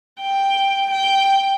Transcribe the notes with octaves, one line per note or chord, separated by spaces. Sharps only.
G5
G5